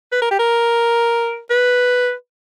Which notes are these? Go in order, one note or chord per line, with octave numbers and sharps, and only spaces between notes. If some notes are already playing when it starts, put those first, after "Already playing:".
B4
A#4
G4
A#4
B4